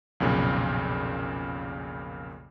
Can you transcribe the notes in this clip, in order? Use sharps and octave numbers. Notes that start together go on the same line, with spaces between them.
B1 F2 A#2 C#3